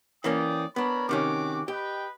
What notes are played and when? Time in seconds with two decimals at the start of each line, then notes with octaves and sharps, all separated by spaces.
0.24 E3 A#3 C#4 D5 G5 D#6
0.76 B3 D4 A#4 C#5 B5
1.09 C3 D#3 C#4 F#4 D6
1.68 G4 B4 D#5 G5